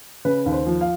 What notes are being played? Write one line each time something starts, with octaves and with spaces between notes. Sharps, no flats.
C#3 B4
D#2
C5
F3
F5